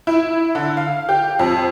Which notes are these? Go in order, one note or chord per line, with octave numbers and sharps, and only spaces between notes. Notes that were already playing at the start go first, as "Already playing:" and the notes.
E4
D3
F5
G4
F2